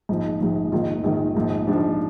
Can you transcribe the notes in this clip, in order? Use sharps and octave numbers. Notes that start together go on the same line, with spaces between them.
A#1 G#2 F3
A#1 G#2 F3
A#1 G#2 D#3 F4
D#4
A#1 G#2 D#3
A#1 G#2 F3
A#1 G#2 F3 D4